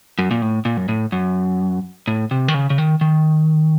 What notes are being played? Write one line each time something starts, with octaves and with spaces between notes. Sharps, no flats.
F#2
A#2
A2
A#2
F#2
A2
F#2
A2
C3
D#3
C#3
C#3
D#3
D#3